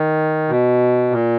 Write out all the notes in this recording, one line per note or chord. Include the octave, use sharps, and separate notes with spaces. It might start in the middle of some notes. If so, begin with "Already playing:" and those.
Already playing: D#3
B2
A#2